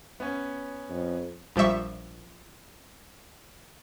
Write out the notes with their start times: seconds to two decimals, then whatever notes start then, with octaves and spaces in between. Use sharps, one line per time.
0.20 B3 C#4
0.90 F2
1.56 A#1 F3 G3 E5 C#6